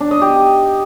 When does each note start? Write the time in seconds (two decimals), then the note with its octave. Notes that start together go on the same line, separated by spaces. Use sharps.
0.01 D4
0.11 D#5
0.22 G4